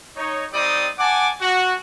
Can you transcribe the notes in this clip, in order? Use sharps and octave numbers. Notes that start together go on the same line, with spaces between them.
D#4 C#5
G3 C4 D#4 G4 D5 D#6
F#5 G#5 A5 D6
F#4